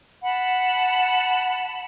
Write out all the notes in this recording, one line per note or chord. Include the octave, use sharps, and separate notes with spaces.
F#5 A5 B5